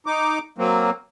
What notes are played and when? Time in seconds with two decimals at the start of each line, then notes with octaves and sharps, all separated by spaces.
0.06 D#4 D6
0.58 F#3 A#3 C4